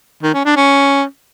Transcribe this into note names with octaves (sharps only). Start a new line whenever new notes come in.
D#3
C#4
D4
C#4